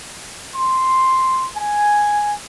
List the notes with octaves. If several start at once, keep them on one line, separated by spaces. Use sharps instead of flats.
C6
G#5